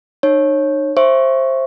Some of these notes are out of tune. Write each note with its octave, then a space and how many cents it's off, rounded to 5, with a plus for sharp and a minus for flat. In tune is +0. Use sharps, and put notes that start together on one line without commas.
D#4 -40 C#5 -20
C5 +20 E5 +15 C#6 +0